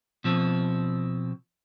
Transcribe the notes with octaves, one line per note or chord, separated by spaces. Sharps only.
B2 F3 C4